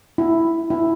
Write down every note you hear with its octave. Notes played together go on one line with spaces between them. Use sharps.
E4
E4